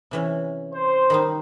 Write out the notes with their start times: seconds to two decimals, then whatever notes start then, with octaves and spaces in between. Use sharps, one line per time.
0.11 C3 E3 C#4
0.73 C5
1.10 D#3 G3 D#4